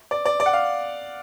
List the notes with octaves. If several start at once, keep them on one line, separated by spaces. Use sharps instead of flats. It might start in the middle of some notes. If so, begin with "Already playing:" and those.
D5
D5
D5
F#5
F5